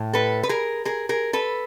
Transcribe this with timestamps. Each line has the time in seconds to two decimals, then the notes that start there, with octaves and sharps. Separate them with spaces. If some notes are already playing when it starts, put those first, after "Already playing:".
Already playing: A2
0.13 A4 B4
0.43 B4
0.49 G#4 A#4
0.85 G#4 A#4
1.09 G#4 A#4
1.33 A4 B4